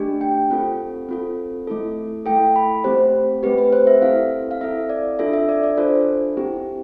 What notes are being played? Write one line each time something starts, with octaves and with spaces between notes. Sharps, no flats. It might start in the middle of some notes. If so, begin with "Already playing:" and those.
Already playing: A3 D4 G4
G5
C4 F4 A4
C4 F4 A4
A3 E4 A4
A3 E4 A4 G5
B5
A3 C4 G4 C5
A3 C4 G4 B4
B4
C5
E5
C4 E4 A4 F5
F5
C4 E4 A4 E5
D5
D4 F4 A4 E5
E5
D5
D5
D4 F4 A4 C5
C4 E4 G4